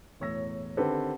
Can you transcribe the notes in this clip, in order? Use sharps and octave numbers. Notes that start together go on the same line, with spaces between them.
E1 A2 C#5 E6 A#6
D3 D#3 C4 G4 A4 B4